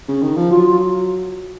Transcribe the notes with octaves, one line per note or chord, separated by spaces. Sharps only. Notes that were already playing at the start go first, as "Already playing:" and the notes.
C#3
D#3
F3
F#3 F4